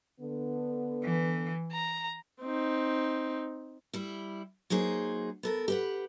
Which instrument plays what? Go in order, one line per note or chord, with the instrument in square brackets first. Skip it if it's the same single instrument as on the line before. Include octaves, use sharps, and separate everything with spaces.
[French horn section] D3 B3
[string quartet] E3
A#5
[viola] C4 D#4
[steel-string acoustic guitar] G3 E4
F#3 A#3 D#4 G#4 C5
B3 A4 A#4
G4 B4 F#5